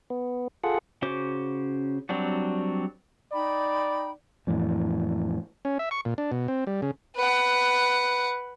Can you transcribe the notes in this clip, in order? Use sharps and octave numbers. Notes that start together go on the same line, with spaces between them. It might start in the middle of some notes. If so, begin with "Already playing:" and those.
B3
F4 G#4 A4 F#5
C#3 C#4 F#4 C5 D6
F#3 G3 C4 D4 F#4
D#4 D5 G5 B5
F2 A2 E3
C#4
E5
C#6
A#2
D4
B2
C4
G3
C#3
B4 F#5